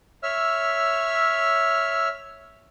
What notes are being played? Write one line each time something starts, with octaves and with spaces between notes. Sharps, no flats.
C#5 E5 E6 F6